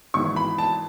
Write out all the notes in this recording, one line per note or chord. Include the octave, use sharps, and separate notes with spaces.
G#1 G#2 E3 C#6
B5
A5